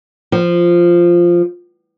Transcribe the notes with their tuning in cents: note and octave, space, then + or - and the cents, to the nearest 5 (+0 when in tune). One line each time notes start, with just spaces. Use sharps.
F3 -5